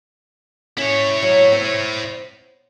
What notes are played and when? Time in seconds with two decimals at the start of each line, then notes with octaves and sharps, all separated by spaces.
0.78 C#4 E4 C#5
1.22 F#3
1.52 C4